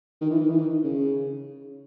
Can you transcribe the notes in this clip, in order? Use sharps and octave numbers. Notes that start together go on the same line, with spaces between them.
D#3
E3
D#3
E3
D#3
C#3